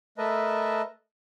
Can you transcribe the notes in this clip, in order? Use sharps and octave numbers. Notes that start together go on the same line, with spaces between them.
A3 A#4 B4 D#5 E5 A5